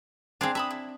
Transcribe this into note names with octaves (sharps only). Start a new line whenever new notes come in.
C4 D4 G#4 C5 F5
E5 A5 B5 D#6
E4